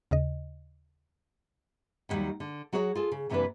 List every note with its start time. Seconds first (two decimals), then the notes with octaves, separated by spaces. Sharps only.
0.11 D#2 C#3 D#5
2.09 D#2 D3 D#3 F#3 G3
2.40 D3
2.72 F#3 F#4 G#4 A#4 C#5
2.95 F4 G#4 A4
3.12 C#3
3.29 F#2 C3 E3 A#3 D4 B4